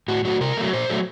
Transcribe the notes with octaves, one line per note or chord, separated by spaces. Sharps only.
A2 F#4
F#3 A3 F#4
C3 A#4
F#3 A3
A#2 C5
F#3 A3